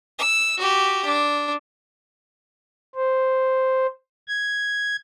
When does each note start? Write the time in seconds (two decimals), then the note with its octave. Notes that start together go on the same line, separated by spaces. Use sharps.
0.18 E6
0.58 F#4 G4
1.05 D4
2.95 C5
4.28 G#6